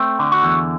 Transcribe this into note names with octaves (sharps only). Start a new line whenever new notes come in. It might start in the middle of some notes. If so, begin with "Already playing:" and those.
Already playing: A3 C4
D3
F#4
E2